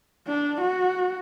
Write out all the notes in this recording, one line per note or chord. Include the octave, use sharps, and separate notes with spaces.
D4
F#4